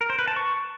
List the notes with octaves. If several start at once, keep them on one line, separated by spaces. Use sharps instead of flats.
A#4
C5
B4
A5
C#6